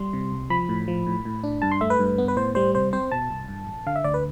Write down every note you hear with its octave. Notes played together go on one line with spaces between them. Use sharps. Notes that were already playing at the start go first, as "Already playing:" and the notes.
Already playing: G3 C6
C3
C2
F3 B5
A2
F3
A2
A2
D4
G2 A5
C6
A3 E5
B4
G2
B3
B4
A2 C5
G3 C5
C3 C5
C4 C5
B2 A5
C2
G2
A1
D3 F5
E5
D2 D5
B4